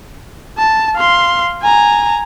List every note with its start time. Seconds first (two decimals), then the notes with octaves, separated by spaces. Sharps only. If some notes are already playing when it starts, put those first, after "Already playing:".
0.58 A5
0.96 F5 C6
1.62 G#5 A#5